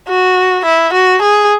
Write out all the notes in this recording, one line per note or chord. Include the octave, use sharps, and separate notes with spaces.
F#4
E4
F#4
G#4